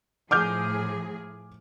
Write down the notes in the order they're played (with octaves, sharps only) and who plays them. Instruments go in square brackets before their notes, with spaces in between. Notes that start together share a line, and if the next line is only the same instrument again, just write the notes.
[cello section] A2 F3 G#4 [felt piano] D6 F6 G6